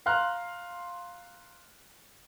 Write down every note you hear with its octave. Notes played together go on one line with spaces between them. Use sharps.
F5 A#5 C6 F6 F#6